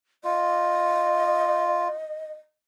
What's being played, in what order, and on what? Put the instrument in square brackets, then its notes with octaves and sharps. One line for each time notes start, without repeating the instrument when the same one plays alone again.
[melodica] F4 [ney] D#5